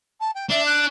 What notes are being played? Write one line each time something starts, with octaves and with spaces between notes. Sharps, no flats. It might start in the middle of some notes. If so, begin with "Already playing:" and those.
A5
G5
D4 E5
F#6